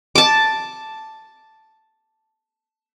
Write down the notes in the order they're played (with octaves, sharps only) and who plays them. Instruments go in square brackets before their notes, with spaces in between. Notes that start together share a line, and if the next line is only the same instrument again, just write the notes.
[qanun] A5 D6